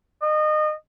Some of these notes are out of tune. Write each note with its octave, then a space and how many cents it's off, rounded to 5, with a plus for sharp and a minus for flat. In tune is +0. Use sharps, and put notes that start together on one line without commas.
D#5 -25